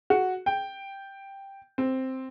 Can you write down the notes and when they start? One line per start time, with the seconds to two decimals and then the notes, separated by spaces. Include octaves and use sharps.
0.10 F#4
0.46 G5
1.78 C4